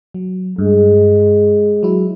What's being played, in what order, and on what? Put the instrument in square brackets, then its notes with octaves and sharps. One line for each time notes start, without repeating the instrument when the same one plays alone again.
[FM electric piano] F#3
[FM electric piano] G2 [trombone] G#3
[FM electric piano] F#3 E4